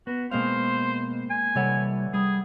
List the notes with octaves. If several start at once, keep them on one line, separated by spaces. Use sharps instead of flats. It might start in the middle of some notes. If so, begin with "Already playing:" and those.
B3 F#4
B2 G#3 A#3 C4 C5 F5
G#5
C3 E3 G3 A4 C#5 F#5
G3 G#4 D#6